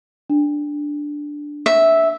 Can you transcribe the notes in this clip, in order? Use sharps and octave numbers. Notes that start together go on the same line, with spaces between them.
D4
E5